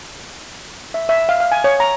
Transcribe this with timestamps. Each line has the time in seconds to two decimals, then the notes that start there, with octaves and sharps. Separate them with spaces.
0.94 E5
1.09 E5
1.29 F5
1.40 F5
1.52 G#5
1.64 C#5
1.80 A#5